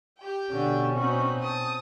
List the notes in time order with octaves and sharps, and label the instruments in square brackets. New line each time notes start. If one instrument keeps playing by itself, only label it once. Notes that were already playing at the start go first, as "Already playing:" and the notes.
[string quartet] G4 G5
[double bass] B2 C#4 [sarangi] D3
[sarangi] C4 [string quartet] D#4 F#4 B4
[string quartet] A5 [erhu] D#6